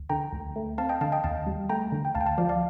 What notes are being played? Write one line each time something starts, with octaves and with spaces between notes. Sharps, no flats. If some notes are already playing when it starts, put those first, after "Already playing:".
Already playing: D2
D3 G5 A#5
D2
A3
C4 F5 A5
D#5 G5
D3 F5 A5
D#5 G5
D#2 F5 A5
G3
A3 G5 A#5
D3
G5
D2 F5 A5
G5
F5 A5
F3 D5 F5
D5 F5